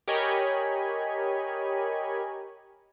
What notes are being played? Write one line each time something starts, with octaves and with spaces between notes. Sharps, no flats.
G4 A#4 C#5 D#5 G#5 B5